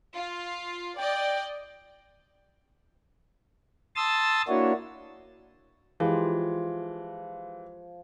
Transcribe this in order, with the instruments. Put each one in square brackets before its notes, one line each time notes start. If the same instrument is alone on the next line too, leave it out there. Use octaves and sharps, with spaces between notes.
[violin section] F4
[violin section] D5 D#5 [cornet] G5
[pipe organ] A5 C6 D#6 E6 A6
A#3 D4 E4 F#4 C#5
[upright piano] E3 G#3 G4 [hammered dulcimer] F3